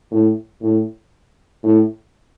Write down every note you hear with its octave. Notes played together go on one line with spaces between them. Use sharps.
A2
A2
A2